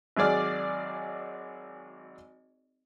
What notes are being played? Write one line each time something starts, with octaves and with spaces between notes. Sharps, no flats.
G#1 F#3 G#4 D5 F6